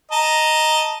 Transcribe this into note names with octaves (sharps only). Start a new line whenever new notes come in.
D#5 A5 A#5